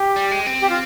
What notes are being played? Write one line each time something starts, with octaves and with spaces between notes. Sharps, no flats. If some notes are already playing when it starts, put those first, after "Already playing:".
Already playing: G4
G3
G#3
C4
G4
F4